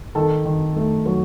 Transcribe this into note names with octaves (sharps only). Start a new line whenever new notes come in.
D#3 A4 A5
D#3
A3
F#3